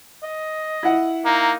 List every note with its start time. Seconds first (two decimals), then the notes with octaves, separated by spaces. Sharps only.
0.23 D#5
0.83 E4 F#5
1.25 A#3 D#4